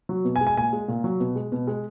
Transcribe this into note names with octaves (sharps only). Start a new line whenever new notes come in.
F#3
B2
G#5
G#3
G#5
A#2 G#5
G#3
A#2
F#3
B2
G#3
B2
G#3